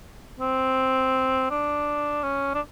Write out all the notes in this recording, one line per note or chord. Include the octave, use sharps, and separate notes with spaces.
C4
D4
C#4
D4